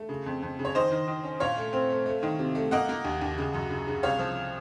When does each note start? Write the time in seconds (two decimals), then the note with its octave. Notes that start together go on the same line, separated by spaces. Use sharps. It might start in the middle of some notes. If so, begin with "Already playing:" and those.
Already playing: A3
0.09 C#3
0.26 F2
0.42 F2
0.59 C#3
0.65 C#5
0.75 D#3 C5 D#5
0.92 D#3
1.08 D#3
1.24 C#4
1.40 A#2 C#5 F5
1.57 A3
1.73 C4
1.90 A3
2.06 A3
2.23 D#3
2.39 C3
2.55 A3
2.71 A#3 D#5 F#5
2.89 A#3
3.05 D#2
3.21 D#2
3.38 C#3
3.54 F#2
3.70 C#3
3.87 C#3
4.03 C2 C#5 F5
4.19 F3